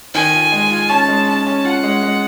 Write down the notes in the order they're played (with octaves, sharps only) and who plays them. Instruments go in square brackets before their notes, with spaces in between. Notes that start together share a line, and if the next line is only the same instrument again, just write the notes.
[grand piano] D#3 [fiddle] G#5
[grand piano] F4
G#3
F4
[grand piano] C#4 [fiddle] A5
[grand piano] G#3
[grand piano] C#4 [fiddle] A5
[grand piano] C#4
[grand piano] F4 [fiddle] F#5
[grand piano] G#3
G#3